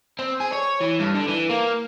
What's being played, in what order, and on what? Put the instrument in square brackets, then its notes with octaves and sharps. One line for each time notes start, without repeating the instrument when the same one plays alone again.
[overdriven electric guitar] C4
G#4
C#5
E3
G2
D3
E3
A#3